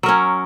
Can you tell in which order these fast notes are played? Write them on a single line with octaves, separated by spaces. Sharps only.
F#3 A#4 C#4